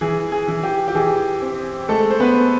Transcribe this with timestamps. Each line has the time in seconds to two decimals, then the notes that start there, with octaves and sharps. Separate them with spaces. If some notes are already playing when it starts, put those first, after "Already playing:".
0.01 E3 G#4
0.32 G#4
0.48 E3
0.63 G4
0.88 G4
0.95 E3 G#4
1.42 C4
1.89 G#3 A3 A4
2.10 C5
2.20 B3 B4